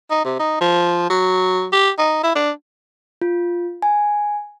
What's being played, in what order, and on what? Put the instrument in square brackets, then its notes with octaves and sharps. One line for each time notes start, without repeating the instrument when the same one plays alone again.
[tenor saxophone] D#4
C3
D#4
F3
F#3
G4
D#4
E4
D4
[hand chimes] F4
G#5